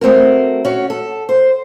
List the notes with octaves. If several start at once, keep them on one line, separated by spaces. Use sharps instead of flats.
A3 C4 F#4 A#4
C#4 F#4
A4
C5